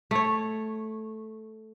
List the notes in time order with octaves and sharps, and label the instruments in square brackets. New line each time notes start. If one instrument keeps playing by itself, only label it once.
[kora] A3 C#5